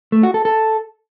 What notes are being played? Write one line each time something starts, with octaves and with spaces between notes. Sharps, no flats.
A3
F#4
A4
A4